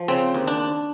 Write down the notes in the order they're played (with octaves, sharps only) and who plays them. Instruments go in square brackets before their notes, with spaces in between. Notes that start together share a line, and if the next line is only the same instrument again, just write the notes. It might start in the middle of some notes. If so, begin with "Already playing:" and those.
Already playing: [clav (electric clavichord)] F3
C#3 C4
D#2
D4